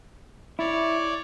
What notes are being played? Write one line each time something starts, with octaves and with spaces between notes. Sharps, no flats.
E4 C#5 D5